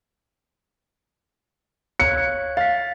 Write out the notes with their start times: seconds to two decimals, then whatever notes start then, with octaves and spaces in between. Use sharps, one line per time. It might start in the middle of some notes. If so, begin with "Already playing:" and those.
2.00 C#5 F5 F#6 C#7
2.57 F5 A6 B6